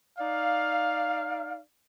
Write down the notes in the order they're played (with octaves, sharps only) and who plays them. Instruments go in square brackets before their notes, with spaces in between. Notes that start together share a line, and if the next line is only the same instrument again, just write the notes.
[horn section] D#4 D5 F5